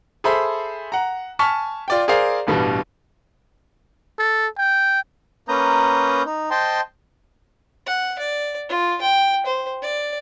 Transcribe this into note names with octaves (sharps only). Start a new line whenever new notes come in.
G#4 A4 C5 E5 B5
F#5 A#5
G#5 A5 C#6 F6 B6
F4 D5 G5
G#4 A#4 C5 D5 F5
A1 G2 B2 G3
A4
G5
A#3 C#4 B4 A#5 D#6 G6
D#4
C5 D#5 G5 A5 C6
F#5
D5
F4
G5
C5
D5